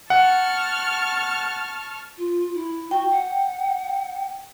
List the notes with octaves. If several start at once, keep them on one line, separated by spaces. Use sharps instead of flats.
F#5 A5 C#6 F6
F4
E4
F#4 G5
F#5